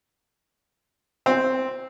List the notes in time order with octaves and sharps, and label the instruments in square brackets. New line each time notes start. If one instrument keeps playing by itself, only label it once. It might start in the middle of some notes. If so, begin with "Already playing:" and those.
[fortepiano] C4